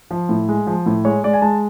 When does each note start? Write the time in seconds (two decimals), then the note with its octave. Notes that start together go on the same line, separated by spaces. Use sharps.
0.11 F3
0.29 A2
0.48 G#3
0.67 F3
0.86 A2
1.05 G#3 C#5
1.24 G#3 D5
1.33 G#5
1.42 G#3 A5